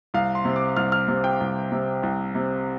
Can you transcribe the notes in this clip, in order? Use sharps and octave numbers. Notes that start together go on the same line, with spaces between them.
C2 F5
C6
C3
D6
C2 F6
F6
C3
G5
C2
C3
C2
C3